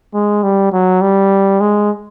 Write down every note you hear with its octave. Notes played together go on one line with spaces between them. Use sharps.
G#3
G3
F#3
G3
G#3